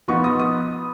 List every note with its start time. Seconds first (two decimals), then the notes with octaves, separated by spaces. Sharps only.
0.08 F3 B3 D#4 C#6
0.24 D#6
0.39 D#6